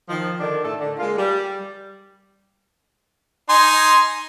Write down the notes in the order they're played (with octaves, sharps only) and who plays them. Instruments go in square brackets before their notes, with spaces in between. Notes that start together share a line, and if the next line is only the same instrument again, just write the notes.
[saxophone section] D#3 F3
D3 D#3 D4
A2 A3 A4
D3
G#3 A#3 F4
G3
[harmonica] D#4 G#5 C6